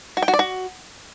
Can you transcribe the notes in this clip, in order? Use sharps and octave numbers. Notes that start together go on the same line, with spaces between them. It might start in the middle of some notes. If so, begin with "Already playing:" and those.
F#4
G5
F#4
D5
F#4